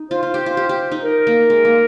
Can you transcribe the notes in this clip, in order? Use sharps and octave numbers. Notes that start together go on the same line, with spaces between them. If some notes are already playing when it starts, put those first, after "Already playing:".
Already playing: D#4
F4 C5
F4
G4
F4
G4
G4
D#4
A#4
A#3
G#3
A#3